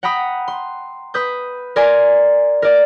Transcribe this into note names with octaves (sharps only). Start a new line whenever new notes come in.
F#5 G5 A#5 B5 D#6
C6
B4 D#6 G6
A#4 D5 G#5 C6
A#4 D5